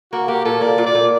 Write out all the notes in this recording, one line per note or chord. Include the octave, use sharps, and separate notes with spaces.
A#3 F#4
A#3 G4
A#2 A4
A#3 D5
A#2
D5
A#2